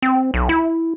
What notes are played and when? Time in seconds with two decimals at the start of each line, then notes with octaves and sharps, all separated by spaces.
0.02 C4
0.34 B1
0.49 E4